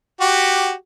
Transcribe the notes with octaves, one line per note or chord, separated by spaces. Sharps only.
F#4 G4